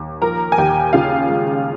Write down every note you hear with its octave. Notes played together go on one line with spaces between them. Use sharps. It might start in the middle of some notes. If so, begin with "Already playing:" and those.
Already playing: D#2
F3 A#4 A#5
G#5
D#2 G4 G5
C#3 F4 F5
G#3